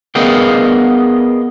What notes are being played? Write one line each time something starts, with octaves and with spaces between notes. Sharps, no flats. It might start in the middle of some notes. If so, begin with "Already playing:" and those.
B3 G#4 A#4 D#5 F5 G5